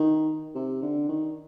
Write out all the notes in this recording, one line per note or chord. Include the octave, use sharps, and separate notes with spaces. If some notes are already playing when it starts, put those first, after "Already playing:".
Already playing: D#3
C3
D3
D#3